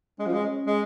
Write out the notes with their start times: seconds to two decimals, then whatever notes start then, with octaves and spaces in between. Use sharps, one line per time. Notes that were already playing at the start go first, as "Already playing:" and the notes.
0.19 G#3 C#4
0.26 F3
0.33 G#3
0.67 G#3